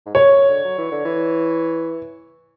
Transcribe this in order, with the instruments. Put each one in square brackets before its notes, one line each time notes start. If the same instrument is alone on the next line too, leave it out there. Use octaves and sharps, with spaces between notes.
[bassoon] G#2
[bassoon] F#2 [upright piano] C#5
[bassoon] F#2
D3
F#3
E3
D3
E3